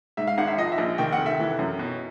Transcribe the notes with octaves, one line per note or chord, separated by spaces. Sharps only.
G#2 E5
F5
G#1 F#5
E5
F3 D#5
E5
A#1
D#3 G5
F#5
F1
E5
E3
F#2
B2